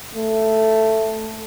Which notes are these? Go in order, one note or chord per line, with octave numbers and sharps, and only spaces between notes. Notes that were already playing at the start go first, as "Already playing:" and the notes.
A3